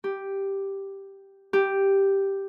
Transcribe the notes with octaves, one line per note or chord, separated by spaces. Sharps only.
G4
G4